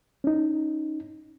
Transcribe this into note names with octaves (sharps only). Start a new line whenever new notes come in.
C#4 D#4